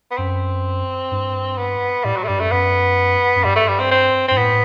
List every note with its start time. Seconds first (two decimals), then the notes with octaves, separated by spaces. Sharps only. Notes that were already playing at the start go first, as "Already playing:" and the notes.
0.11 B3
0.18 F#2 C4
1.11 G2
1.58 B3
2.04 A2 G3
2.17 F#3
2.23 A3
2.28 G2 G3
2.39 F#2 A3
2.52 F#2 B3
3.36 F#2
3.44 G2 G3
3.56 A3
3.68 G3
3.80 C4
3.91 C4
4.28 G2 C4
4.37 A2 B3